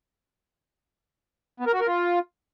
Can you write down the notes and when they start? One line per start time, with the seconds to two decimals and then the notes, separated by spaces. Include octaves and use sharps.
1.60 B3
1.67 A#4
1.74 F#4
1.80 A#4
1.87 F4